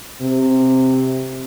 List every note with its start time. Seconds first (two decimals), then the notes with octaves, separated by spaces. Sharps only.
0.21 C3